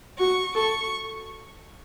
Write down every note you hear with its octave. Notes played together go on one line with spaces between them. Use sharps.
F#4 C#6
A4 C#6